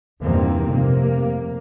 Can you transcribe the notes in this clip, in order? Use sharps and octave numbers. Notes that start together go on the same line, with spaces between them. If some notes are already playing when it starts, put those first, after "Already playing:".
E2 G2 C3 D#3 A#3 C4
F1 C3 A#3